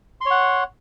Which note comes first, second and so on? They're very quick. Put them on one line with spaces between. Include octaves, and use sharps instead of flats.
C6 C#5 F#5